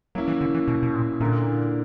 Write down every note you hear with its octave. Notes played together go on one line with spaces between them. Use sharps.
F#3 A#3 C#4 E4
E3
D3
E3
B2
B2
A#2
A#2 D3 A#3 E4 A#4